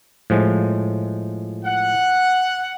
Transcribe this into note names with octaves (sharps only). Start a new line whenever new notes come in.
A2 F3 G#3
F#5